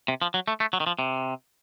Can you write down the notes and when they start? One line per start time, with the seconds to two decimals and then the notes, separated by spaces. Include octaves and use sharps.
0.08 C3
0.22 F3
0.34 F#3
0.48 A3
0.60 A3
0.73 F#3
0.80 D#3
0.87 F3
0.99 C3